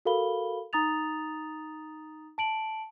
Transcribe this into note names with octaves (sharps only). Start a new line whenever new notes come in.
F#4 A4 A#4 F5 B5 G7
D#4 A#5 D#6 A6 F7
A5 D7 F#7